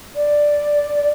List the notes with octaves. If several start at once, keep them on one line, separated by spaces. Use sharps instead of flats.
D5